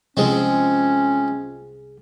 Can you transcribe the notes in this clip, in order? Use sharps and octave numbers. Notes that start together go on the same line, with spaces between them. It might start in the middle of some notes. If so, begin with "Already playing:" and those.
C2 F3 G#3 C4 C#4 G#4